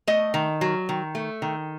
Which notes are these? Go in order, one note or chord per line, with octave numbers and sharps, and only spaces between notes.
A3 D#5
D#3
F#3
D#3
A3
D#3